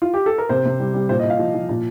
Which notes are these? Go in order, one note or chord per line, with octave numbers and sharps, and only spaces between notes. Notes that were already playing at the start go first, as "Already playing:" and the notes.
F4
G4
A4
A#4
C3 C5
C3
G3
G3
A#2 C5
D#5
A#2
F5
F3
F3
A#2